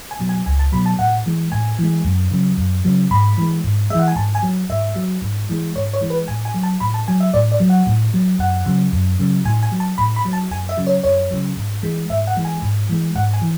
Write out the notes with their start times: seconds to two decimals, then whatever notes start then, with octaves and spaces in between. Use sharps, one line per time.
0.11 G#5
0.20 B2 F#3
0.29 G#5
0.46 C#2 G#5
0.59 A5
0.72 B2 F#3 B5
0.86 A5
0.99 A2 F#5
1.26 E3 G#3
1.52 A2 G#5
1.79 E3 G#3
2.04 F#2
2.31 C#3 F#3
2.58 F#2
2.85 C#3 F#3
3.11 G#2 B5
3.38 E3 G#3
3.64 G#2
3.90 G#3 E5
3.95 E3 F#5
4.08 G#5
4.16 G#2 A5
4.35 G#5
4.42 F#3
4.70 G#2 E5
4.96 F#3
5.22 G#2
5.49 E3 G#3
5.76 G#2 C#5
5.93 C#5
6.01 E3 G#3
6.10 B4
6.28 A2 G#5
6.45 G#5
6.54 F#3
6.63 A5
6.80 A2 B5
6.94 A5
7.08 F#3 G#5
7.20 E5
7.34 A2 D5
7.52 D5
7.60 F#3
7.70 F#5
7.87 A2
8.14 F#3
8.39 F#2 F#5
8.66 C#3 F#3
8.93 F#2
9.20 C#3 F#3
9.45 A2 G#5
9.63 G#5
9.72 F#3
9.80 A5
9.98 A2 B5
10.16 B5
10.25 F#3
10.33 A5
10.51 F#2 G#5
10.69 E5
10.77 C#3 F#3
10.87 C#5
11.04 F#2 C#5
11.31 C#3 F#3
11.57 G#2
11.83 E3 G#3
12.10 G#2 E5
12.27 F#5
12.36 E3 G#3
12.45 G#5
12.62 G#2
12.89 E3 G#3
13.16 G#2 F#5
13.34 G#5
13.42 E3